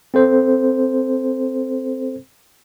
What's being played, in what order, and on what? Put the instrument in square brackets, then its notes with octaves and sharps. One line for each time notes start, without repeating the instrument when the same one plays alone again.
[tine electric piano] C4 A4 C5